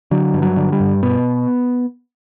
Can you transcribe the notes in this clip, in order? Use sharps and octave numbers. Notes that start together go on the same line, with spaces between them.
D3 F#3
G2
F#3
D3
G3
G2
B2 B3